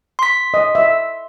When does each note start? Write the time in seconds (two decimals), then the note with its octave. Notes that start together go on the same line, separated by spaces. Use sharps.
0.19 C6 B6
0.54 D#5
0.75 E5